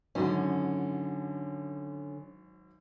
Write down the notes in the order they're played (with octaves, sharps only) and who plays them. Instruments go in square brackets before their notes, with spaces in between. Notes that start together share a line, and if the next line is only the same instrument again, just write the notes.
[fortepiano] G#1 F#2 [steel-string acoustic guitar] D3 C#4